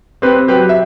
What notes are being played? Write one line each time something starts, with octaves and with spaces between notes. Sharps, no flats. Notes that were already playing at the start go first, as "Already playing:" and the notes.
C4 G4 B4
F#3 G4 B4
E5